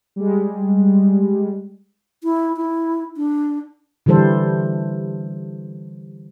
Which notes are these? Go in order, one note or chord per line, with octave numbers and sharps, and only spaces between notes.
G3 G#3
E4
E4
D4
D3 E3 G3 A4 C5